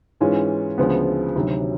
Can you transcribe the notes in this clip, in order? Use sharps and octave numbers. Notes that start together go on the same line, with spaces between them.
G#2 E3 G#3 C#4 F4
D2 C#3 F3 G#3 B3
D2 C3 D#3 F#3